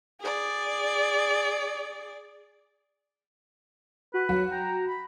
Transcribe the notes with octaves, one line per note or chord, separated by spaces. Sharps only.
G#4 D5
F#4 B4
F#3 F#4
G5 A#5
B5